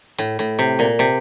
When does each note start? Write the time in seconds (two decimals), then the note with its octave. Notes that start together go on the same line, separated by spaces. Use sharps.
0.18 A2
0.39 A2
0.59 C3
0.79 A#2
0.99 C3